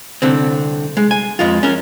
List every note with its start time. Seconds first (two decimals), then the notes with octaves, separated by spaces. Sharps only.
0.22 C2 D3 C4
0.97 G#3
1.11 G#5
1.39 F2 G#3 F4
1.63 C#4 A#4